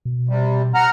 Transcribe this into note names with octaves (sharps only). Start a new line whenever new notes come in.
B2
C3 G3
F#5 A#5 F6